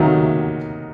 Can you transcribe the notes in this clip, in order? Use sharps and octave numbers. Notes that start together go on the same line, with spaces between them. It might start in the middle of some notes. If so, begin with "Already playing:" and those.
Already playing: D#2 D#3 F#3